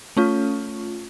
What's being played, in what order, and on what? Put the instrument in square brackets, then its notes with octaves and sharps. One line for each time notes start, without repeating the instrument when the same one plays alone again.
[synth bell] A3 C#4 F4